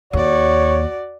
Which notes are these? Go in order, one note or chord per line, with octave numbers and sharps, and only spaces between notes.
D#2 F#4 C#5 D5